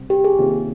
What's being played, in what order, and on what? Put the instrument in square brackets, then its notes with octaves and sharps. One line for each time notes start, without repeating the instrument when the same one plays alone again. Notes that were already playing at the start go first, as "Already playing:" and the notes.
Already playing: [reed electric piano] C3 G3 C4
[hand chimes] G4
G#4
[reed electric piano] C3 D#3 A#3 C#4 F4